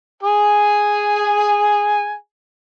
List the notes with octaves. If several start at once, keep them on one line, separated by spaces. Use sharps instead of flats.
G#4 G#5